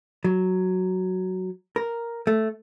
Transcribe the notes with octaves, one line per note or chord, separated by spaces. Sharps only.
F#3
A#4
A3